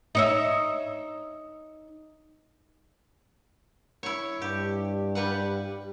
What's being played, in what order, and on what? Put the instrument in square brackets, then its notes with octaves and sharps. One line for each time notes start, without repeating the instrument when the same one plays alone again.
[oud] D#4 C#5 E5
[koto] E4 C#5
[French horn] G2 [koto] G4
[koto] G3 B4 F#5